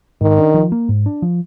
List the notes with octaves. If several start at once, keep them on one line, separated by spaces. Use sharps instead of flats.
G#2 D#3
D4
F3
A#3
G#2
D4
F3